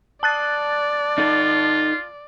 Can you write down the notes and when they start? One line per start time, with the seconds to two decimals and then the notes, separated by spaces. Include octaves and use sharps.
0.23 D5 A5 F#6 A6
1.18 D#4 F4 A4